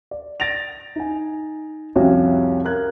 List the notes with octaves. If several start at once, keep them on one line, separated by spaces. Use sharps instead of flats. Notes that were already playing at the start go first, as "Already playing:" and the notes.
D5
A6 A#6 D7 F7
D#4 G#5
C2 F2 C#4 F#4 G4 F5
A#4 F5 F#6 G#6